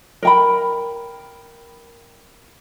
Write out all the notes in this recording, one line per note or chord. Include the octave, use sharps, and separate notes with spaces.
A#4 G5 B5